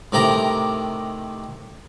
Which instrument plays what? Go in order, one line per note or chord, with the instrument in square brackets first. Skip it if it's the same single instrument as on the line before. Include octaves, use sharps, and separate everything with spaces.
[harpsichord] A2 C3 D#3 G4 A#4 A#5